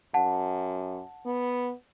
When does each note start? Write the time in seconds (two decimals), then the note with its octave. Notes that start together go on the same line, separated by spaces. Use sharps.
0.14 F#2 F#5 A5
1.26 B3